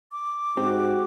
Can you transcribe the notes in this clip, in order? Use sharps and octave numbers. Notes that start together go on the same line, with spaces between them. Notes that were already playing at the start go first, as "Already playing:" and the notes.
D6
G#2 C4 F#4 G4